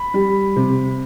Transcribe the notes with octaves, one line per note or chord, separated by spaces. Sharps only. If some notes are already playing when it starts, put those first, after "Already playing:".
Already playing: B5
G3
C3